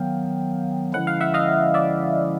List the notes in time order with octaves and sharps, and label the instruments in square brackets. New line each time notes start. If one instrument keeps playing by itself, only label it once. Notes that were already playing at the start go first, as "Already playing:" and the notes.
Already playing: [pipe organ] D#3 F#3 B3 [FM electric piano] F5 G5
[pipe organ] D3 F3 G#3 C#4 E4 [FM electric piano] F#5
[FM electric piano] F5
E5 F#5
D#5 F5
D5 E5